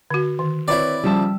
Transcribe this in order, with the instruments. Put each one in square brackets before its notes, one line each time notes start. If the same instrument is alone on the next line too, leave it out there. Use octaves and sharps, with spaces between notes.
[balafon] D3 F#4
D#3
[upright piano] C4 B4 C#5 [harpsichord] E4 D5
[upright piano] C#3 F3 A5 [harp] G3 E5